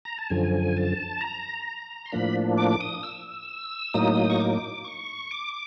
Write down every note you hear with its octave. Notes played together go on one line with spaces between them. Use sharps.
A#5
A5
F#2 D3 F3 G#5
A5
A#5
C6
A2 F3 A#3 D4 B5
D6
D#6
E6
A2 F#3 A#3 D#4 D#6
C#6
D6
C#6
D6